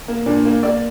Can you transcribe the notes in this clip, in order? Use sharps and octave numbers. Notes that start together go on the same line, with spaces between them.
A#3
A#2 D4
A#3
A#3 D5